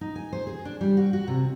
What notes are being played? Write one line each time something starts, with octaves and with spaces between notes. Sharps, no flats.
D#4
G#5
C5
G#4
D4
G3
F#4
F#4
C3